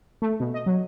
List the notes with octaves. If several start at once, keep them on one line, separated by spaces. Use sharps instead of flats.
A3
B2
D#5
F#3